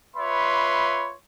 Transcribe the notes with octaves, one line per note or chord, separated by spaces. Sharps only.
F4 B4 C#5 E5 B5 C6